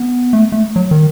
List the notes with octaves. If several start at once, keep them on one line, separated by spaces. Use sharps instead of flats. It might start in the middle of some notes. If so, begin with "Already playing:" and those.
Already playing: B3
A3
A3
F#3
D#3